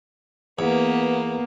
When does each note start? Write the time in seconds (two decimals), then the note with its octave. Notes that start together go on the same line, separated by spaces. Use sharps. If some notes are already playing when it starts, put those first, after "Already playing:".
0.59 E2 A#3 B3